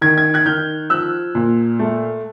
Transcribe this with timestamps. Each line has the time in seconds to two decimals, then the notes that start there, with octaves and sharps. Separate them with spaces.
0.01 D#3 G#6
0.18 G#6
0.34 F#6 G#6
0.45 D#3 F6 G6
0.90 F3 E6 F#6
1.35 A#2
1.79 A3